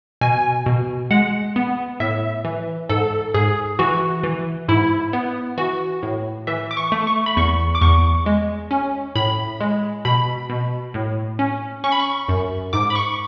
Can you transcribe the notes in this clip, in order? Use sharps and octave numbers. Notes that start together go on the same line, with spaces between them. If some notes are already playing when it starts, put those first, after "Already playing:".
B2 G#5
B2
G#3 F#5
B3
A2 E5
E3
G#2 A4
G#2 G#4
E3 F#4
E3
G#2 E4
B3
E3 F#4
A2
E3 E5
D6
C#6
A3
C#6
B5
E2 C#6
D6
E2 C#6
G#3
C#4
A2 B5
G#3
B2 B5
B2
A2
C#4
C#4 C#6
B5
C#6
F#2
G#2 D6
B5
C#6